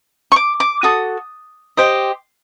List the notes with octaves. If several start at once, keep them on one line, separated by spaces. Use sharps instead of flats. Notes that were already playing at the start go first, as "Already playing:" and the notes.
C#6
D6
D6
F#4 A4 D#6
G4 C5 D#5